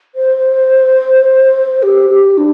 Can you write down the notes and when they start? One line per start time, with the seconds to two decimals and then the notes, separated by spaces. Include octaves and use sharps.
0.15 C5
1.83 G4
2.10 G4
2.38 D4